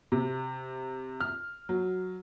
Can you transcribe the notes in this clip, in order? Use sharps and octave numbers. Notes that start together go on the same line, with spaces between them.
C3
F6
F#3